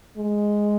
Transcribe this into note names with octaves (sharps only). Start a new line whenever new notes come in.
G#3